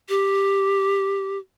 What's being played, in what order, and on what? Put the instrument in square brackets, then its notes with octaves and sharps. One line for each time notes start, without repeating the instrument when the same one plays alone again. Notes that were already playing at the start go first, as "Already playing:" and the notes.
[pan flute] G4